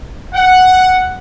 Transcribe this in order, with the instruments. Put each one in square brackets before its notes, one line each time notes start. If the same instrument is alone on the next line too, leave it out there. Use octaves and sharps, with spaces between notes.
[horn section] F#5